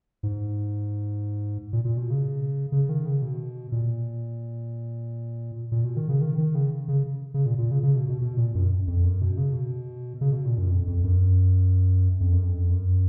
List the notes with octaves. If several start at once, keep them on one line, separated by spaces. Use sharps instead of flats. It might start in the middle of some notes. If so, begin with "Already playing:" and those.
G#2
A#2
A#2
B2
C#3
C#3
D#3
C#3
B2
A#2
A#2
B2
D#3
C#3
D#3
D#3
C#3
C#3
C#3
A#2
A#2
C#3
C#3
B2
B2
B2
A#2
F#2
F2
F#2
B2
C#3
B2
C#3
B2
A#2
F#2
F2
F2
F#2
F2
F#2
F2
F#2